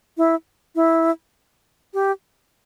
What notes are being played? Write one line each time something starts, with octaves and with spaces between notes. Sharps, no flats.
E4
E4
G4